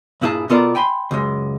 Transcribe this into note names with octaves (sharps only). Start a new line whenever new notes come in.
G2 A#2 E4 G#4 A5
B2 B3 F4 A4 A#4 D5
G5 G#5 B5 C6
C#2 F#2 G#3